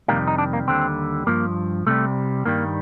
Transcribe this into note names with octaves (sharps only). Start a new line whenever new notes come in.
F2 C3 D#3 G3 A#3
D#4
D4
A#3
D#2 D3 G3 C4
G2 F3 A#3
C2 C3 G3 A3
G2 D#3 G3 A#3